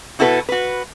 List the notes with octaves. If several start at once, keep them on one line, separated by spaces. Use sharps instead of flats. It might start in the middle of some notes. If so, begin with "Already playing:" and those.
B2 E4 F#4 A4 B4
F#4 B4